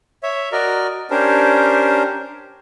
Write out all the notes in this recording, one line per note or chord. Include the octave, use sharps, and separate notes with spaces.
C#5 E5
F#4 A#4 D5 D#5
C#4 D4 G4 A#4 C5